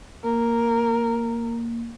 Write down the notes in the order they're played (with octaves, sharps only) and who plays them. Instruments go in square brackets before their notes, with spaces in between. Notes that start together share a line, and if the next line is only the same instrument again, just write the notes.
[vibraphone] A#3 [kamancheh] A#4